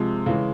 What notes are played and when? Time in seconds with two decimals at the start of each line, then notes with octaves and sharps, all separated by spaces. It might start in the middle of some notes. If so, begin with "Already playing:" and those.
Already playing: C3 F3 G#3
0.26 C#3 E3 G#3